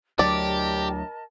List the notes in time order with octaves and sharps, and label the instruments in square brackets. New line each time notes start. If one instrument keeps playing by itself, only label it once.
[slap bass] D2 F#3 [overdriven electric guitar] G4 [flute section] A#4 D#5 A5 [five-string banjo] D5